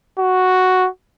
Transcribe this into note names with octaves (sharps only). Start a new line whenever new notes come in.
F#4